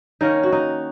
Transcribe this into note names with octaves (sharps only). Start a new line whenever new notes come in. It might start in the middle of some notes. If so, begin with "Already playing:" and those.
D#3 A#3 C#4 D#4
F#4
D#4